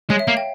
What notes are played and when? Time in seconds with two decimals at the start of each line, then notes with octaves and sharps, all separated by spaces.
0.10 G#3 C#5
0.19 E5
0.27 A#3 F5
0.37 G5